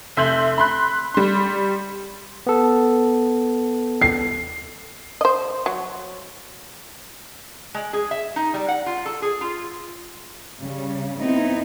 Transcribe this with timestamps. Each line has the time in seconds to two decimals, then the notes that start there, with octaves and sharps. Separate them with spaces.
0.17 F1 E5 C6 G6 F#7
0.58 B5 C6 F#6
1.14 G3 C6
2.47 B3 A4
4.01 C7
5.21 C5 D#5
5.66 F#3
7.74 G#3
7.93 G#4
8.11 E5
8.36 D#4
8.54 G3
8.68 F#5
8.86 F4
9.06 A4
9.22 G#4
9.41 F4
10.59 C#3 G3
11.21 B3 C4 D#4 E4